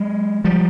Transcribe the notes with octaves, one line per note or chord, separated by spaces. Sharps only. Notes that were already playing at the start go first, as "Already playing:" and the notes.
Already playing: F#3 G#3
F3 G3